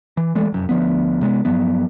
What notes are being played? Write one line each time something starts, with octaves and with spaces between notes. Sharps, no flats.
E3
E3 G#3 A3
F1 F#2
D2 F3 B3
C3 G#3 B3
G2 F3 F#3 B3